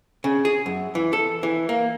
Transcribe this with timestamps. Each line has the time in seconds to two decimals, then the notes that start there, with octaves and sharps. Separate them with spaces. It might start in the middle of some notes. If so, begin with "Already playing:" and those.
0.24 C#3
0.45 G#4
0.66 F#2
0.95 E3
1.13 A4
1.43 E3
1.69 A#3